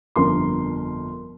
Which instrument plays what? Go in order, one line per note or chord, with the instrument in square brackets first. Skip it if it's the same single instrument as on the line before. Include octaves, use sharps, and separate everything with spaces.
[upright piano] G1 F2 A#4 C6